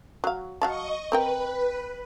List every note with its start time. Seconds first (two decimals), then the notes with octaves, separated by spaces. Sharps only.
0.24 F#3 F5
0.62 F#3 D#5 F5 A5 C#6
1.12 C4 A#4 B4 G5